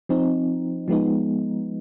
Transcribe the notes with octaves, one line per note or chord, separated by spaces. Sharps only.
F3 C4 D#4
F3 G#3 B3 D#4